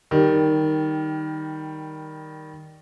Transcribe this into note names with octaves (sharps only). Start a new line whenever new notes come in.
D#3 G3